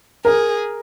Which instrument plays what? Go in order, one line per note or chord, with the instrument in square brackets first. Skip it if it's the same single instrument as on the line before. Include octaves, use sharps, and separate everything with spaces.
[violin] G#4 [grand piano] A#4